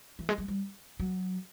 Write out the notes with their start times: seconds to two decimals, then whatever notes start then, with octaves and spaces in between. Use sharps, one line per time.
0.19 E3
0.29 G#3
0.38 G3
0.48 G3
1.00 F#3